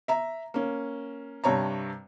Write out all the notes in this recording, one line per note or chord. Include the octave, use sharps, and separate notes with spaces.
E5 A#5
A#3 C#4
G2 C3 C#5 A5 A#5